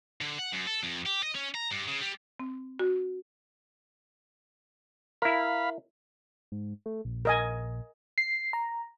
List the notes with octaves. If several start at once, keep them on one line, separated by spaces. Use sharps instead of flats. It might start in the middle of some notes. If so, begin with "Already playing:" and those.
D3
F#5
F#2
A4
F2
G4
D#5
C#4
A#5
G2
C#3
G3
C4
F#4
E4 A#4 F5 B5
G#2
A3
A#1
A#4 D#5 G#5
C7
A#5